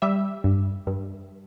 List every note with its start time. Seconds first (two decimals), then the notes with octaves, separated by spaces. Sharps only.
0.02 G3 E5
0.44 G2
0.87 G2